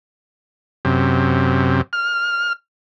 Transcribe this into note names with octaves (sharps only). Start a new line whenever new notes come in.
F#2 C3
F6